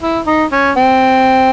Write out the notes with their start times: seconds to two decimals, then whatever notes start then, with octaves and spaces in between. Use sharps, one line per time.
0.02 E4
0.27 D#4
0.52 C#4
0.77 C4